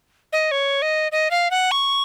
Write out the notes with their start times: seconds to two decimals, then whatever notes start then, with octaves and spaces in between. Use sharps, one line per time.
0.33 D#5
0.51 C#5
0.82 D#5
1.12 D#5
1.31 F5
1.51 F#5
1.71 C#6